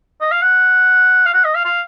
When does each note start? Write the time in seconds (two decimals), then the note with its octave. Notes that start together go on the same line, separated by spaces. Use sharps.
0.21 D#5
0.32 F5
0.42 F#5
1.26 F5
1.34 F#5
1.44 D#5
1.55 F5
1.65 F5